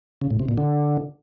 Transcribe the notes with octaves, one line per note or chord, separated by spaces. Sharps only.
C#3
A2
C3
A#2
D3